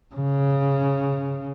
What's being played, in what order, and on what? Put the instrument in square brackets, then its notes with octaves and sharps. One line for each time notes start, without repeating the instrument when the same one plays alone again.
[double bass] C#3